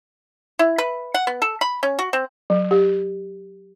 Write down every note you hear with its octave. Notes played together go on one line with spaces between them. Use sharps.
E4
B4
F#5
B3
A4
B5
C#4
F#4
C4
F#3
G4